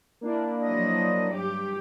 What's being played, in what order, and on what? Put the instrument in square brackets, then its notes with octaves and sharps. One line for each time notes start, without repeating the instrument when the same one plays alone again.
[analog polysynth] A#3 D4 E4
[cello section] F3 F#3 D#5
G2 G4